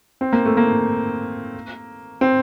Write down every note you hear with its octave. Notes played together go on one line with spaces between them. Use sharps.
C4
A#3
A3
A#3
C4